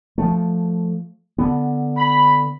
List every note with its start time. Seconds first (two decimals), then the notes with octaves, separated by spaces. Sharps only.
0.18 F3 A3
1.38 D3 B3
1.97 B5